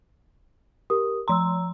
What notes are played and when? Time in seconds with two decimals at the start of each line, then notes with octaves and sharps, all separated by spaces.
0.90 G4 A#4 D#6
1.28 F3 A#5 C6 E6